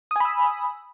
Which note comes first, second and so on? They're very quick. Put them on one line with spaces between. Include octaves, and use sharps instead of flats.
D#6 G#5 B5 E6